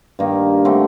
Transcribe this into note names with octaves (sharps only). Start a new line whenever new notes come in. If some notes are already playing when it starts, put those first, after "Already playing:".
G2 D#3 A#3
D3 A3 C4